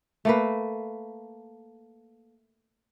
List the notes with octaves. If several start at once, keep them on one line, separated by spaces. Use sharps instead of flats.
A3 A#3 B4